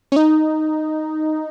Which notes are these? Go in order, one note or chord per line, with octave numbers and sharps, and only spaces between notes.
C#4
D#4